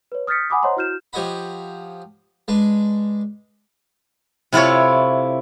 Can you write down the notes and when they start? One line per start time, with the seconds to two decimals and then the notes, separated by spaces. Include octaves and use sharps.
0.12 B4 C#5
0.27 D#6 F6 G6 A6 B6 C#7
0.50 F#5 G#5 B5 D6 D#6
0.63 C5 C#5 D#5 F#5 A#5 C6
0.77 E4 F#4 F6 G6 E7
1.13 F3 G4 C#5 D#5 F#5 B5
2.48 G#3 D4 B4
4.53 C3 E4 F4 A4 C#5